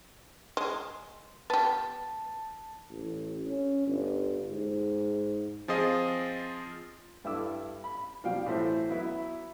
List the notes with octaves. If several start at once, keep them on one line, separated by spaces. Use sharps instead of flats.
G#3
B3 G4 A5
A1
C#4
G1
G#2
F3 C4 F4 G#4 D#5
G2 E4 A4 D6 E6
B5
B2 F3 G3 F5 G5
A2 E3 A4 C5 E5
F#3 B3 E4